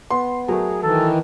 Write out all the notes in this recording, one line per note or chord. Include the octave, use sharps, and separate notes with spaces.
B3 C6
F#3 A3 G#4 A#4
D#3 E3 A4